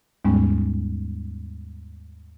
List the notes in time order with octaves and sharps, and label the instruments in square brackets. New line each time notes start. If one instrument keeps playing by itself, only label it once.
[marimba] D#2 G#2 G3 G#3 B3 C#4